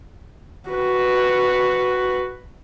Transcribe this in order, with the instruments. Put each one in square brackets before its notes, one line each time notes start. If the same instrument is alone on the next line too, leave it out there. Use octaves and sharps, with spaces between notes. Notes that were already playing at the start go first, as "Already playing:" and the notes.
[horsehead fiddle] F#4 B4